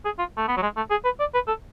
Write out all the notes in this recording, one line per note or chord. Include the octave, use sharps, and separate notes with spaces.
G#4
F4
A3
B3
F#3
G#3
A3
G#4
B4
D5
B4
A4